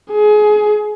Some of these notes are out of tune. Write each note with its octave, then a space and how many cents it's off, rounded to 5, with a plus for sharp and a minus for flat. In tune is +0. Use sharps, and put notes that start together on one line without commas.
G#4 +25